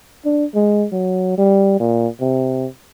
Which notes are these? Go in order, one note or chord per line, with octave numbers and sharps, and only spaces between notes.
D4
G#3
F#3
G3
A#2
C3